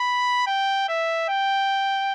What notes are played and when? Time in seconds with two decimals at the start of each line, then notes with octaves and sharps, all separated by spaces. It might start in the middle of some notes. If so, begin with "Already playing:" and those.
Already playing: B5
0.47 G5
0.88 E5
1.29 G5